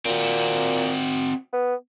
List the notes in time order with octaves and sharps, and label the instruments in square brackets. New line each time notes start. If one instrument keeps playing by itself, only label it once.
[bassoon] A#2 [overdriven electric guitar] C4 F#4
[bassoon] B3